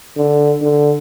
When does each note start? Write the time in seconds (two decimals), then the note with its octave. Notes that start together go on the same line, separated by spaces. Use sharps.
0.17 D3
0.62 D3